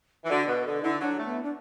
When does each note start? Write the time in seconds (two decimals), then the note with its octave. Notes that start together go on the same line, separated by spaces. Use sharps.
0.24 E3
0.30 D3 F#4
0.47 B2 B4
0.65 D3 A4
0.83 D3 E4
1.00 F#3 D4
1.18 A3
1.25 B3
1.43 D4